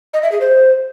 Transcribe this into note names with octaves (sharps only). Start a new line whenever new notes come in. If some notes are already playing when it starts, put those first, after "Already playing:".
D#5
E5
G#4
C5